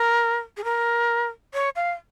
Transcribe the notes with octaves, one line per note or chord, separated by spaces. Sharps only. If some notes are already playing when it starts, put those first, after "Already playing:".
Already playing: A#4
G#4
A#4
C#5
F5